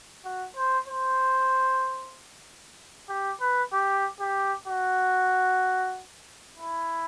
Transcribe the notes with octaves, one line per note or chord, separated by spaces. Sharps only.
F#4
C5
C5
G4
B4
G4
G4
F#4
E4